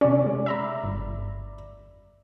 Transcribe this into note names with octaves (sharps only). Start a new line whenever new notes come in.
C3 C#4 D5
G#3
E5 A#5 B5
G1